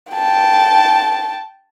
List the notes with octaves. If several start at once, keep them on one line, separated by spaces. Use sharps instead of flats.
G5 A5